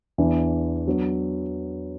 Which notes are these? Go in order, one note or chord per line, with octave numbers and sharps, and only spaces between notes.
E2 E3 D4
F#3 B3 D4